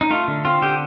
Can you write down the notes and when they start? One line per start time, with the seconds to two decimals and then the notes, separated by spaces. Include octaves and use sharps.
0.01 D#4
0.10 A3 F4
0.28 D3
0.45 C4 F4
0.62 D3 G4